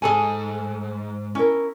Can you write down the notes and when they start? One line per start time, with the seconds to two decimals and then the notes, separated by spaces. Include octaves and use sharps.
0.02 G#2 G#4 A4 G#5
1.35 C#4 E4 A#4